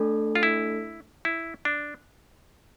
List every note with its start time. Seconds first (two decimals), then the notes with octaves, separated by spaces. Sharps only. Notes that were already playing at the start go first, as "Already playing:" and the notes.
Already playing: A3 D4 A4
0.35 F4
0.43 E4
1.25 E4
1.65 D4